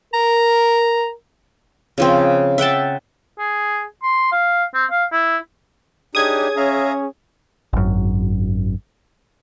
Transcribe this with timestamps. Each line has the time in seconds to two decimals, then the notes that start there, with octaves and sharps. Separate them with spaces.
0.14 A#4 A#5
1.98 C#3 F3 C4
2.58 E5 F#5 G5 A5
3.38 G#4
4.03 C6
4.32 F5
4.74 C4
4.91 F5
5.12 E4
6.15 D4 D#4 G4 G#4 C#5 D#6 G#6
6.57 C#4 E5 F5 A#5
7.73 G#1 F#2